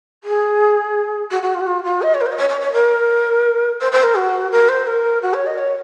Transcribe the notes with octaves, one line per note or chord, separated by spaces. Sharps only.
G#4
F#4
F#4
F4
F#4
F4
F4
D#5
C#5
A#4
C5
D#5
C#5
C#5
C#5
A#4
C5
C5
A#4
F#4
A#4
C5
A#4
F#4
C#5
D#5
C#5